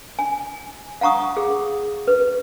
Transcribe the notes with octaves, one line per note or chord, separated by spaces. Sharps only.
G#5
F5 F#5 A#5 C#6 D#6
G#4
B4